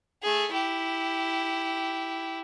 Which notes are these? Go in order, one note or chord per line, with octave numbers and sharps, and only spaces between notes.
A3 G#4
E4 G4